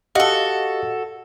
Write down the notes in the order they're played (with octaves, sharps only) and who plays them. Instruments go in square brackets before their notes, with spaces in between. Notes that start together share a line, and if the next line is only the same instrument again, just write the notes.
[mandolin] F#4 A4 [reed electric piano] G4 D#5 F5